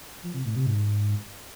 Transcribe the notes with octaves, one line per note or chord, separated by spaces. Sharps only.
F3
C3
A2
C3
G#2